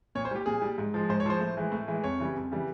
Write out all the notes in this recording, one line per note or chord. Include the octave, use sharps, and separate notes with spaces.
A#2 C#5
C5
G3 G4
A#2 G#4
G3
G#2
F3 G#3
G#2 C5
C#5
F3 G#3 C5
A2
E3 G#3
A2
E3 G#3
F2 C#5
C#3 E3 G3
F2
C#3 E3 G3